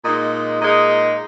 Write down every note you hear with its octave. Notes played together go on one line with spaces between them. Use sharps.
A#2 G#3 D#4 D#5
A#2 G#3 D#4 D#5